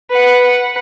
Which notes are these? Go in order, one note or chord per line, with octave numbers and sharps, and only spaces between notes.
B4 F#5